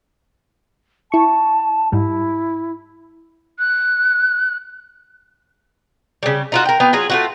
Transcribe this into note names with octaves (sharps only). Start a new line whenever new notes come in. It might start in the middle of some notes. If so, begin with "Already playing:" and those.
E4 A5 C#6
G#2 G3 E4
F#6
C#3 G3
D#4 F4 F#4
A#4 G5
B3 F4 G5
F#3 F4 G#4
A3 F4 F#4